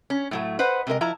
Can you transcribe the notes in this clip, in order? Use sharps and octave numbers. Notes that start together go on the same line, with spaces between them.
C#4
A2 F#3 A3
B4 C5 D#5 F#5
C3 G#3 A#4 D#5
F3 E4 A#5